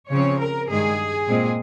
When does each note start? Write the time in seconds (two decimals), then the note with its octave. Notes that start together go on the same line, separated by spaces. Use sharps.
0.11 C#3 F3 C4 C#5
0.40 A#4
0.69 G2 D#3 G#3 G#4
1.27 A#2 G#3 C4